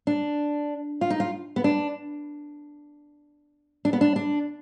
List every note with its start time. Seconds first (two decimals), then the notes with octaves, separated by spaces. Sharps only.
0.07 D4
1.01 F4
1.10 D#4
1.20 F4
1.56 B3
1.64 D4
3.85 D4
3.93 B3
4.01 D4
4.16 D4